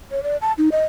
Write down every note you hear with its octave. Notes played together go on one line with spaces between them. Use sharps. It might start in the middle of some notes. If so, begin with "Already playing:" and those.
C#5
D5
A5
D#4
D#5